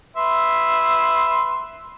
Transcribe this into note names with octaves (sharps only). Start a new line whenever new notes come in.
B4 E5 C6